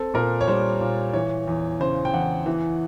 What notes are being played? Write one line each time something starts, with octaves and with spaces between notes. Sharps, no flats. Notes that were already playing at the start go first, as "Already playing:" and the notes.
Already playing: C4 A4
A#2 A#4
C#5
G3 C5
A#2
E3 C#5
E2
C#3 C5
G5
E2 F#5
E3